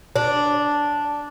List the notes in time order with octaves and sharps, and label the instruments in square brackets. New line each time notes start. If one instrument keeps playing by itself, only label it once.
[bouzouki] D4